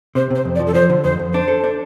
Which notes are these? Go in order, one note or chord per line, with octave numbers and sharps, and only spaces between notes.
C3 C5
C3 C5
F2
D5
F3
A4
F3 C5
D3
F2 C5
F2
D4 C5
A4
D4